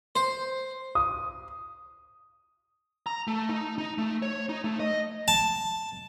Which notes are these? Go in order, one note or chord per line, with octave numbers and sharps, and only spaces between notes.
C5
D#6
A#5
A3
D#4
D#4
A3
C#5
D#4
A3
D#5
A5